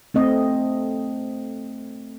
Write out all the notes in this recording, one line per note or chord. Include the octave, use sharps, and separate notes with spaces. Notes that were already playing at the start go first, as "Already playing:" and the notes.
A3 C4 D#5